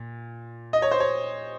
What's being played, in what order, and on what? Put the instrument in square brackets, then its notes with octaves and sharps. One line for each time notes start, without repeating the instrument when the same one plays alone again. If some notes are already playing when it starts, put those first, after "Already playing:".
Already playing: [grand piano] A#2
D#5
C#5
C5
C#5